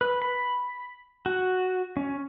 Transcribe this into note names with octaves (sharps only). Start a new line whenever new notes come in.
B4
B5
F#4
C#4